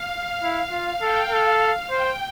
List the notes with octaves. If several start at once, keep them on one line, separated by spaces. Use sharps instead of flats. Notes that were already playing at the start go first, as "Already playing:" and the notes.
Already playing: F5
E4
F4 F5
A4 G5
A4 F5
F5
C5 G5